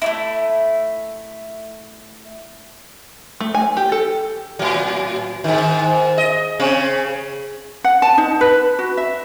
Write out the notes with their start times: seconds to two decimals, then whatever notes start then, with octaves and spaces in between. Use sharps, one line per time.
0.02 A3 D4 E4
3.41 A3
3.55 G#5
3.77 G4
3.92 A4
4.59 A2 F#3
5.44 G#2 D#3
6.18 D#5
6.60 C#3 C4
7.84 F#5
8.02 A5
8.18 D#4
8.41 B4
8.79 F#4
8.97 E5